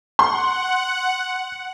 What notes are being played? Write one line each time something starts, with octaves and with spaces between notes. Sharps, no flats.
F#5 C6